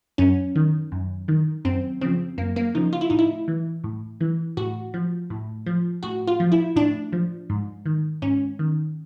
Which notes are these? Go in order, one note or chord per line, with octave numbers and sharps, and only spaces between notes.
F#2 C#4
D#3
F#2
D#3
F#2 C4
C#3 F3 C4
F#2 A#3
A#3
C#3 F3 D#4
F4
E4
A2 D#4
E4
E3
A2
E3
A2 F#4
F3
A2
F3
A2 F#4
F4
F3
E4
A2 D4
F3
G#2
D#3
G#2 C#4
D#3